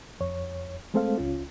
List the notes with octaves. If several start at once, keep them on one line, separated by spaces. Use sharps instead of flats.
F2 C#5
G#3 A3 C4 A4 C5 F5
C#2 C#4 F4